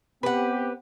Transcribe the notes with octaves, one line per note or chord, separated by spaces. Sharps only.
B3 C4 G4 B4 F#5